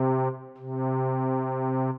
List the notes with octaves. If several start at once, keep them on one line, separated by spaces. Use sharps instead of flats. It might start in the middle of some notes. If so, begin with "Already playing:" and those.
Already playing: C3
C3